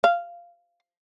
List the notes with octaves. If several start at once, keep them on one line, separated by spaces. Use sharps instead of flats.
F5